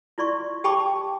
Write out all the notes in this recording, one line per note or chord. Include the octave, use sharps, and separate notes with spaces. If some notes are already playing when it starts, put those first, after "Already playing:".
E4 F4 D5 C6 C#6
G4 G5 A5 B5 C#6 D6